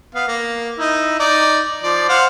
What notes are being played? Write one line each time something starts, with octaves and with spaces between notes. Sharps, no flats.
B3 F5
A#3
D#4 E4
D#4 D5
F3 D5
C5 F5 F#5